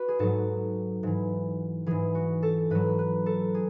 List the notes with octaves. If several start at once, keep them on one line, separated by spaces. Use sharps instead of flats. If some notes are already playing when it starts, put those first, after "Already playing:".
Already playing: F#4 B4
G#4
G#2 F#3 A4
G#2 E3
G#2 E3 G#4
F#4
A4
G#2 F#3 B4
B4
A4
G#4